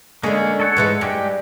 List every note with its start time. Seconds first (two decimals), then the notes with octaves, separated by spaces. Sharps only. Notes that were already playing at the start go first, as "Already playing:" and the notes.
0.23 D3 G#3 A#3 C#4 G#4
0.60 A4 C#5 F#5
0.77 G#2 E3 G#3
1.01 G2 G#3 G4